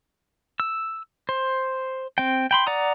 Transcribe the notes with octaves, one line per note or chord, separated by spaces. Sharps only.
E6
C5
C4 G5
G5 B5 C6
D5 F#5 A#5 D#6